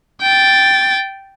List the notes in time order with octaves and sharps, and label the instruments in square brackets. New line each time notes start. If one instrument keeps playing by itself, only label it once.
[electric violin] G5 A6